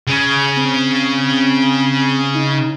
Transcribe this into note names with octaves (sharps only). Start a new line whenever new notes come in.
C#3 C#4
C4
D#4